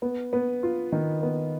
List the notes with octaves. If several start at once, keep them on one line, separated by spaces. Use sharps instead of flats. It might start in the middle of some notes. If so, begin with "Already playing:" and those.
B3
B3
F4
D#3
B3